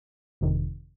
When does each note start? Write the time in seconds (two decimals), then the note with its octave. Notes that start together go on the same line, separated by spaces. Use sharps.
0.41 G1 F2 C3 D#3